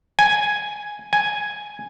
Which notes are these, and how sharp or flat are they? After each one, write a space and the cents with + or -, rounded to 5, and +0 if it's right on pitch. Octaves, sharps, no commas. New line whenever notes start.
G#5 +0
G#5 +0